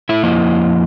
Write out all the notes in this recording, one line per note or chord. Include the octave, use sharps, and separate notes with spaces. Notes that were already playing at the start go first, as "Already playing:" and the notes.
A3 E4 E5
F2 F3 A#3 E4 D#5